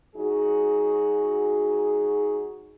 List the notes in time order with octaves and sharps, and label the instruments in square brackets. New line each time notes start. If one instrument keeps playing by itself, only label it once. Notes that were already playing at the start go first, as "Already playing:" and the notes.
[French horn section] F#3 D#4 F#4 G#4